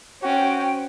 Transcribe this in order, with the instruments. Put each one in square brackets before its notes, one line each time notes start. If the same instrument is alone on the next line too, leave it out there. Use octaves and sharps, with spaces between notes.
[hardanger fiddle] C#4 [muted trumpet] F#4 [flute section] C5 G5